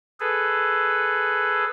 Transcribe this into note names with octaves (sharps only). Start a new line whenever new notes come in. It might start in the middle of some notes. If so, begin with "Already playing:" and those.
G#4 A4 B4